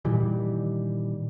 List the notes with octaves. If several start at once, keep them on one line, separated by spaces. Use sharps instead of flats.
A#2 D#3 E3 G3